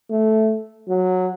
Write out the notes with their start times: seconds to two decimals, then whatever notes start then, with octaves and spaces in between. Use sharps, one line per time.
0.11 A3
0.89 F#3